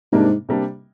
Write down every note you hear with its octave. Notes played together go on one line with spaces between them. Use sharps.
G#2 C3 G3 A#3 D4
C3 G3 A#3 D4